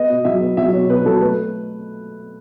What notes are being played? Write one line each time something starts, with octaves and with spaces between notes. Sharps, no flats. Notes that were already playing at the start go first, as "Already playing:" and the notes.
Already playing: B3 D#5
B2
F#3 E5
B3
F#3 E5
B2 C#5
B2 B4
F#3 A4
A3 B4